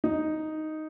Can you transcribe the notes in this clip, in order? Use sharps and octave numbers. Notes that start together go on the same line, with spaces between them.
D#4